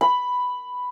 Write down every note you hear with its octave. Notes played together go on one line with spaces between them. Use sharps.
B5